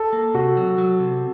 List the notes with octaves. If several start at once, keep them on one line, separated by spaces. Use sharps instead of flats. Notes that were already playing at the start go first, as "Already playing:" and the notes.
Already playing: A4
A#3
C3 F#4
F#3
F#3
C3